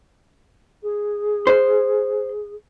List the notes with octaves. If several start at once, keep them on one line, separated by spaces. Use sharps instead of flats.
G#4
C5